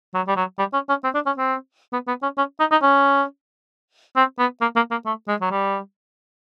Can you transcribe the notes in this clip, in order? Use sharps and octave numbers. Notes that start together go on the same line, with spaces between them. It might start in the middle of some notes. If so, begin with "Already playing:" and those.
F#3
G3
F#3
G3
C#4
C#4
C4
D4
C#4
C4
B3
B3
C#4
C#4
D#4
D#4
C#4
C4
B3
A#3
A#3
A#3
A3
G#3
F#3
G3